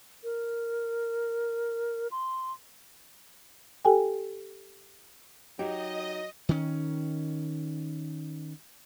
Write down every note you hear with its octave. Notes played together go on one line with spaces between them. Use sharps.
A#4
C6
G4 A4 G5 G#5
F#3 D#4 G4 D#5
D#3 C#4